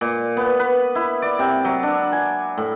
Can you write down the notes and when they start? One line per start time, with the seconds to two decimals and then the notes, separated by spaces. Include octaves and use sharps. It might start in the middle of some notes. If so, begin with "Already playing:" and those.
0.01 A#2
0.37 B3
0.59 B4
0.95 E4
1.22 D5
1.39 C3
1.64 F#3
1.83 D4
2.12 G#5
2.58 A2